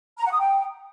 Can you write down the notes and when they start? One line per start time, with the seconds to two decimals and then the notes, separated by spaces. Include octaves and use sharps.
0.18 A#5
0.25 F#5
0.32 D#6
0.40 G5